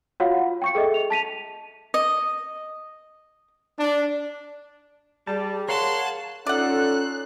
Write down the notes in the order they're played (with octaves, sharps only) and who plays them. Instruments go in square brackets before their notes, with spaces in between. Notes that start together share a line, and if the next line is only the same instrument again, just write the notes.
[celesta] F4 F#4 C#5 F5 F#5
F4
G5 C#6 C#7
G#4 A4 D#5 E5
F7
A5 B6 D#7 F7
[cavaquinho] D#5
[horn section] D4
[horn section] G3 [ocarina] G#4 [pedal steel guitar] A5
[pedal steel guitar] A#4 F5 F#5 [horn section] C#5 C6 [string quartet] A5 F#6
[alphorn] C#4 [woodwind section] D#4 F4 A4 [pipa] D5 F#5 [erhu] F#6